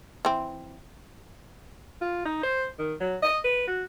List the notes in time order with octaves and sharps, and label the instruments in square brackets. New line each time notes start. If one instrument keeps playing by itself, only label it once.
[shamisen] E3 C4
[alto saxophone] F4
D#4
C5
D#3
F#3
D#5
B4
F#4